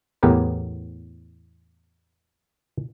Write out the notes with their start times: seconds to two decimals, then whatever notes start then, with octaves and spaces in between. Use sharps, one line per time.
0.23 E2 A2 B3 G4 A#4 B4